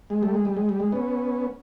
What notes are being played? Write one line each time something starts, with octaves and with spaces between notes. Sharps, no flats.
G#3
G3 A3
G#3
G3
G#3
G3
G#3
B3 C#4